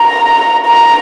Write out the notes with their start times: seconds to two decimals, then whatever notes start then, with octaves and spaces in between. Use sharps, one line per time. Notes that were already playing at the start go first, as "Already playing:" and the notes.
Already playing: A#5
0.66 A#5